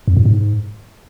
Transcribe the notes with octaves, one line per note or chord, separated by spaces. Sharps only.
F2
A2
G#2